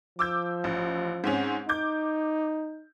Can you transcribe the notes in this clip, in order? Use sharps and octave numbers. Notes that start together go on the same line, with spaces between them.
F3 D6 E6 G6
A1
G#2 C4 C#4
D#4 D6 G6